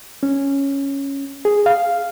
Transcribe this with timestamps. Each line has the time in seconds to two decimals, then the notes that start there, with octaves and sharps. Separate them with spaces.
0.23 C#4
1.45 G#4
1.66 F5